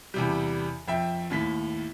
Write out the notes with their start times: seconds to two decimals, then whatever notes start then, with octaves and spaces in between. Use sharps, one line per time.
0.14 E2 C3 G3
0.88 F2 E5 G5
1.30 D#2 A2 B6